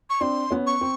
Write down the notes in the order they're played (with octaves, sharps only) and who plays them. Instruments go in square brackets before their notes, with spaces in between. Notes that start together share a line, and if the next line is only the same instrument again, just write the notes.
[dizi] C#6
[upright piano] C4 D4 [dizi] C6
[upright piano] B3 C#4
[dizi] C#6
[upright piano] C4